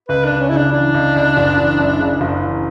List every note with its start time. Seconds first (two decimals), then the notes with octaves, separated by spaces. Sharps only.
0.09 C#2 B4
0.25 D4
0.31 C#2
0.41 C#4
0.49 C#3 E4
0.57 D4
0.72 E3 D4
0.94 C#2
1.16 C#2
1.37 F#1
1.57 E3
1.79 F#2
2.00 C#3
2.21 F#1
2.43 E3